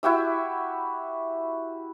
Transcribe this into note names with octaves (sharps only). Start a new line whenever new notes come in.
E4 F#4 G4 E5